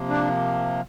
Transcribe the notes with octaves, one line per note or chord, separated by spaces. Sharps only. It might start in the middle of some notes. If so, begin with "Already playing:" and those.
Already playing: C3 F3 A#3
D4